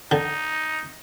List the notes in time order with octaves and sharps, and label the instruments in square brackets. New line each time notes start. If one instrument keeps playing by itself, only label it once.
[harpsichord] D3 [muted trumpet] D#4